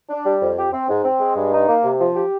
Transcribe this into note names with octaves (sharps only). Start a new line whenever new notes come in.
D4
G3
F2
G4
C4
G#2
C4
G#3
G2
D#4
A#3
C3
F3
G4